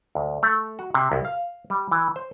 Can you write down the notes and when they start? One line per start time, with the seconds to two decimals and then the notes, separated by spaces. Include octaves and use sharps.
0.15 D2
0.43 A3
0.79 F#4
0.94 C3
1.12 C2
1.25 F5
1.70 G3
1.91 E3
2.16 C5